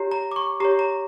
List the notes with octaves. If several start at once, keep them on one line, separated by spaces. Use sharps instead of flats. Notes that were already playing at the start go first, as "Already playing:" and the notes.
Already playing: G4 C#5 A#5
A#5
D6
C#6
G4 C#5 A#5
A#5